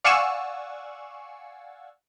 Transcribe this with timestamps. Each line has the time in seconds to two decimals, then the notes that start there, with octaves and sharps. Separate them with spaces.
0.04 D5 F5 F#5 G#5 C#6 E6